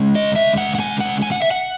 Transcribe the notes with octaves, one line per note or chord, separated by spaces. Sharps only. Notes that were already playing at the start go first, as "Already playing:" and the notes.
Already playing: C#3 G#3 C#4
D#5
E5
F#5
F#5
G#5
F#5
G#5
F#5
E5
F#5